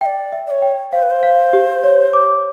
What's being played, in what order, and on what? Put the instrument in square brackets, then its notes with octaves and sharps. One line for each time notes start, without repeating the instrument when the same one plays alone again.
[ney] E5 [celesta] G5
[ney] D5
[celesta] E5
[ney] D5
C#5
[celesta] G5
[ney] C5 [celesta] F5
[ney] B4
C5
[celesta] F5
G4
C#5
D6